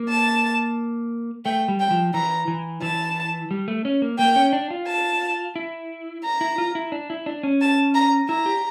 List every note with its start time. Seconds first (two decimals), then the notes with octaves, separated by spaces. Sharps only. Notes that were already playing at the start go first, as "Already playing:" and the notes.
Already playing: A#3
0.09 A5
1.45 A3 G5
1.68 G3
1.80 G5
1.91 F3
2.14 E3 A#5
2.48 E3
2.82 E3 A5
3.51 G3
3.68 A3
3.85 C#4
4.02 A#3
4.18 A#3 G5
4.36 C#4
4.53 D4
4.70 F4
4.87 A5
5.56 E4
6.24 A#5
6.41 E4
6.58 F4
6.75 E4
6.92 D4
7.10 E4
7.26 D4
7.43 C#4
7.61 A5
7.94 A#5
8.29 E4 A#5
8.46 G4